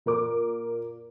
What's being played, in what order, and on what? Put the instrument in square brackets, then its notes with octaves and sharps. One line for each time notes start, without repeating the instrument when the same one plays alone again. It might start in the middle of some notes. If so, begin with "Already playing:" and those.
[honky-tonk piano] A#2 A#4 D6